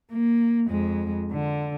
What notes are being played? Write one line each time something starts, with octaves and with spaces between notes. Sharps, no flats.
A#3
F2 G#3
D3